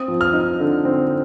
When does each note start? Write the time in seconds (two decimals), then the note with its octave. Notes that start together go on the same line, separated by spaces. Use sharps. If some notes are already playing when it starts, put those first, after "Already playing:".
Already playing: C4 D#6
0.08 F3
0.21 F6
0.33 D#4
0.60 D3
0.85 C4